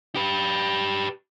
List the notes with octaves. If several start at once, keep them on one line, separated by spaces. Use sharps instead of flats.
G4 B4